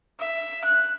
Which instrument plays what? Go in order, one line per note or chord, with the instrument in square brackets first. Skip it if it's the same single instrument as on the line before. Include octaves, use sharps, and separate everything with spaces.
[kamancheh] E5
F#6